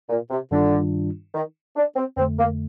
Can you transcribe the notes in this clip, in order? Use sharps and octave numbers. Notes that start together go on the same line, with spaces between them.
A#2
C3
G2 D3 D#3 G3 D4 F4
D#3
D4
C4
F2 D3 A3 C4
A#3